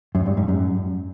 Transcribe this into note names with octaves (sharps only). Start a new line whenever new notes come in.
F#2
G2
G#2
F#2